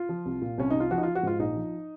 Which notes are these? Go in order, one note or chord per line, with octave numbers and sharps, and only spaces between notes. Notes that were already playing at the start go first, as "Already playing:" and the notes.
Already playing: F4
F3
C2
A#2
C2 C#4
C2 D#4
F4
F3 F#4
D#4
F4
F3
F#4
G#2 F4
A#1 D#4
F3